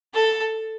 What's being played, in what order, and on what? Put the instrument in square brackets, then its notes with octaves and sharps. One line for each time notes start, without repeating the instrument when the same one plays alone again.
[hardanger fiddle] A4